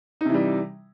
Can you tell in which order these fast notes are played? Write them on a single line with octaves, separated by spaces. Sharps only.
D#4 C3 E3 G3